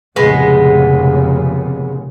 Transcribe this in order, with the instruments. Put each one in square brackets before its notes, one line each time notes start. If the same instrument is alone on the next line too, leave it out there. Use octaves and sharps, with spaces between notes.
[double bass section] F1 A#2 C#3 [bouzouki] G#3 B3